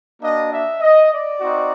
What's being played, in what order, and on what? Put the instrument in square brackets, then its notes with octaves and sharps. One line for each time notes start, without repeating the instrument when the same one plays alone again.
[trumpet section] A#3 D4 F#4 D#5
E5
D#5
D5
C4 D#4 F#4